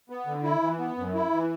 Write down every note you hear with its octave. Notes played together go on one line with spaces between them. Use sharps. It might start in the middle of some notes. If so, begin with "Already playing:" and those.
B3
D3
E4
E3
B3
F#2
E4
E3